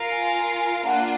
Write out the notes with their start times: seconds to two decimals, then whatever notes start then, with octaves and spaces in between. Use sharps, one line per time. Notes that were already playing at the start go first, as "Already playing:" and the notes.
Already playing: F4 A#4 F5
0.11 G#5
0.85 A#3 D4 F4 F#5